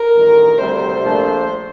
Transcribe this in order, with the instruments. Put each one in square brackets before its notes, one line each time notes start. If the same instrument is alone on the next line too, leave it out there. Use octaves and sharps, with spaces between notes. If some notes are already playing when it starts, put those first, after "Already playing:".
Already playing: [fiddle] A#4
[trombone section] A1 G2 D#3
[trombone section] D2 C3 G3 [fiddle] C5
[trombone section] A#1 A#2 F3 A3 D4